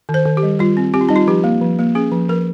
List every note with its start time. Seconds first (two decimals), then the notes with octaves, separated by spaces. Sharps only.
0.09 D#3
0.14 C5
0.25 D#3
0.37 G4
0.43 G3
0.59 G3 F4
0.77 C4
0.94 C4 G4
1.01 F4
1.09 G3 D#4
1.16 F4
1.28 F3 G4
1.44 A#3
1.61 F3
1.79 A#3
1.95 C#4 G#4
2.12 F3
2.29 F3 A#4